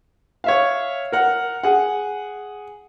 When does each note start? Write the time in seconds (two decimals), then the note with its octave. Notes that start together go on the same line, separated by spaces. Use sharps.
0.44 C#5 E5 F5
1.12 A#4 F#5
1.63 G#4 F#5